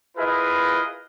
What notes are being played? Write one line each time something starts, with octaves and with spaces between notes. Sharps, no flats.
E4 F4 G#4 A#4 B4 D#5